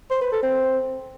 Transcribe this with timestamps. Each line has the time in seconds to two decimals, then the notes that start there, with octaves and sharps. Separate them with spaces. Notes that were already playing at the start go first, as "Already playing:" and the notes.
0.11 C5
0.21 B4
0.32 A4
0.43 C4